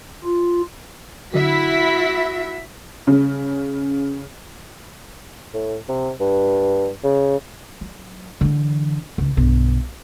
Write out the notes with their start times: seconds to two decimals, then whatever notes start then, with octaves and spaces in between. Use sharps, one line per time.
0.24 F4
1.34 D3 F#3 E4 F#4 E5 B6
3.07 C#3
5.54 A2
5.89 C3
6.20 G2
7.04 C#3
7.81 F#3
8.41 D3 E3
9.18 C#2
9.37 B1 G2